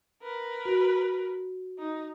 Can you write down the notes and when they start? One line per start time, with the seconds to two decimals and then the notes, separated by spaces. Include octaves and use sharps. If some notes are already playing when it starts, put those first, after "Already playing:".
0.22 A#4 B4
0.65 F#4
1.79 D#4